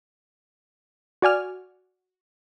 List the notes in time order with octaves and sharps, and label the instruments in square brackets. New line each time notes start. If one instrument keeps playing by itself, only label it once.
[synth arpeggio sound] F#4 D5 G#5 F6